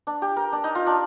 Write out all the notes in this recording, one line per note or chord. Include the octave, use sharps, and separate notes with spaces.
D4
G4
A#4
D4
D#4
F4
D4